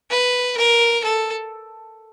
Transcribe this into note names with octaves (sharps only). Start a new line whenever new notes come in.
B4
A#4
A4